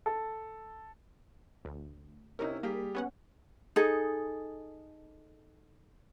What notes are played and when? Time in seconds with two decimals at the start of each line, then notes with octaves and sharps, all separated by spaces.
0.06 A4
1.65 D2
2.39 C3 C#4 D#4 E4 A#4
2.63 G3 A#3 G4 G#4
2.95 B3 C#4 F#5
3.76 D#4 G#4 A4